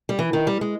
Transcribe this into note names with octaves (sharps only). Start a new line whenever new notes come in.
G3
E3
D#3
G3
G#3